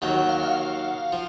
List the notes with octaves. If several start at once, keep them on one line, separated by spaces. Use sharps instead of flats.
D#2 D#3 F#3 F#5
F#5
F5
F5
F3